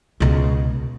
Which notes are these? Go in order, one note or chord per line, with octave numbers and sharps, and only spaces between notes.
C#2 B2